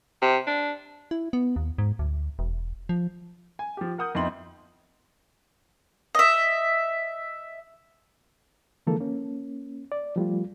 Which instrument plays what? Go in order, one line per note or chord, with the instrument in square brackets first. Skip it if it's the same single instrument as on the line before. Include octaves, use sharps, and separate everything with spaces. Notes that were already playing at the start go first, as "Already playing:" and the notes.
[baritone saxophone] C3
D4
[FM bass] E4
B3
D#2
G#2
D2
E1
F3
[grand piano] G#5
F3 G4
A#4 F#5 D#6 G6
F2 B3 D#4 E4 C6 F#7
[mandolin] D#5 E5
[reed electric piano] D3 E3 F3 G#3 A#3 A4
A#3 C#4
D5
F3 G3 A3 F4